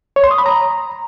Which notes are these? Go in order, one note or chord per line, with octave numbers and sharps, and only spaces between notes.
C#5
C6
D#6
B5
A#5